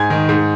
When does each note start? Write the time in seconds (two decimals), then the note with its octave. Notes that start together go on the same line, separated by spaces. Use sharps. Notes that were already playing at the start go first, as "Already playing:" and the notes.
Already playing: G#2 G#5 G#6
0.10 D#3
0.29 G#2